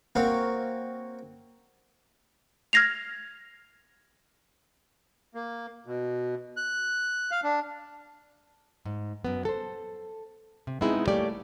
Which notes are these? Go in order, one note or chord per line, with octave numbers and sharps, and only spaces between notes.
A#3 C4 F#4 C#5 F5
F6 G#6 A#6 C7 F7
A#3
B2
F#6
F5
D4
G#2
F#2 B3
A4 C5
C3
G#3 B3 C4 D#4 E4 G#4
G3 A3 A#3 G4 C#5 D5